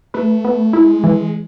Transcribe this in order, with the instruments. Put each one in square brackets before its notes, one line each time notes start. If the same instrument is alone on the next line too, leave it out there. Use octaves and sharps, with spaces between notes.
[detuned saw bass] A3 [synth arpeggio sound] B4
[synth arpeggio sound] B3
[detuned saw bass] G#3 [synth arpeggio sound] E4
[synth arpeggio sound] E3